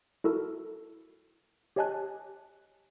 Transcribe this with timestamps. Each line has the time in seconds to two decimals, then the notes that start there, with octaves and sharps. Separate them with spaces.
0.24 E4 F#4 A4 A#4
1.76 G4 C#5 D#5 G#5 A5 F#6